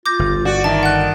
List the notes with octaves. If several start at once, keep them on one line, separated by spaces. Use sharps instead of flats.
F4 D6 G6 A#6
G1
F#4 D5
D#3 E5 A5
F#5 F#6